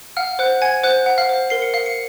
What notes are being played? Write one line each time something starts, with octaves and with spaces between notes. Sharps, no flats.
F5 F#5 F6
C5 F#5 F#6
F#5 G#5 G#6
C5 F#5 F#6
F#5
F5 F6
C5
A#4 C7
C#7
F5 C7
C#7